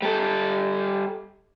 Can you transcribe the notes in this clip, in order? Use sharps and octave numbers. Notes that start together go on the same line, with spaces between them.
G3 A4